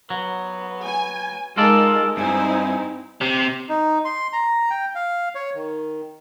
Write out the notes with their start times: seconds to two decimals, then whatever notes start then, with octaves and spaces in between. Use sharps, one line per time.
0.10 F#3 B3
0.86 G#5
1.57 G#3 D#4 F4 A4 A#4 D5
2.17 G2 C4 D#4 E4 G#5
3.21 C3
3.69 D#4
4.05 C6
4.33 A#5
4.70 G5
4.95 F5
5.35 C#5
5.55 D#3